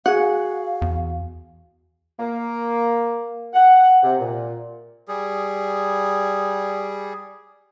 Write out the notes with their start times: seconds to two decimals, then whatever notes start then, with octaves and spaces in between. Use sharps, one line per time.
0.06 F#4 G#4 F5 F#5
0.82 E2
2.19 A#3
3.53 F#5
4.02 C3
4.18 A#2
5.08 G3 G#4